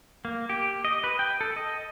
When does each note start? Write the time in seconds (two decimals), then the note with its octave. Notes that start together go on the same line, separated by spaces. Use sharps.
0.25 A#3
0.50 G4
0.85 D#5
1.04 B4
1.19 G5
1.41 A4
1.56 D#5